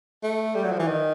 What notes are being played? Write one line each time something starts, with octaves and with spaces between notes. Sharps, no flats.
A3
G3
F#3
F3
E3
D#3